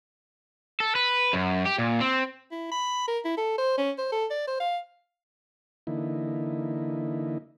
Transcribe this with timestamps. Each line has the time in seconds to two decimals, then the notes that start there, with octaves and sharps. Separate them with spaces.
0.80 A4
0.95 B4
1.33 F#2
1.65 G4
1.79 A#2
2.01 C4
2.51 E4
2.71 B5
3.08 A#4
3.25 E4
3.37 A4
3.58 C5
3.78 C#4
3.98 C5
4.12 A4
4.30 D5
4.47 C5
4.60 F5
5.87 D3 E3 A#3 D#4 E4